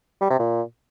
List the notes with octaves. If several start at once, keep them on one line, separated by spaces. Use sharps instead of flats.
G3
C3
A#2